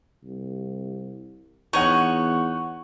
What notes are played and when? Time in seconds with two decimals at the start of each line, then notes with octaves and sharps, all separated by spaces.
0.24 C2
1.73 E2 D#4 C#5 F#5 C#6